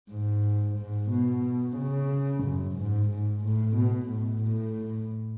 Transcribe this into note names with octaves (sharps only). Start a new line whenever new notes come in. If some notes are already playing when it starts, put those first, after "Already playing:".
G#2
G#2
B2
C#3
F#2
G#2
G#2
A2
B2
A2
A2